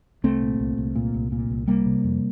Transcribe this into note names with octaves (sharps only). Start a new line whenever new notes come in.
C2 A3 C4
A#2
C2
C2
A#2
C2
A#2
C2
C3 G3 A#3
C3
F2